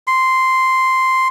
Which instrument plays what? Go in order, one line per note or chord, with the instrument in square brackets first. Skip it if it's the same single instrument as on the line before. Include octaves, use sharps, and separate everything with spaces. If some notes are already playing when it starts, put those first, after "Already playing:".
[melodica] C6